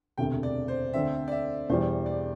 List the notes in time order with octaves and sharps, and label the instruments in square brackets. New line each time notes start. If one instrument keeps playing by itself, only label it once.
[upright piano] E1 D2 C3 [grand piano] G5
[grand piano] D5
C5
[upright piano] D2 D3 C4 [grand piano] E5
[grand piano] D5
E5
[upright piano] E1 E2 E3 G3 [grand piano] C5
[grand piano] D5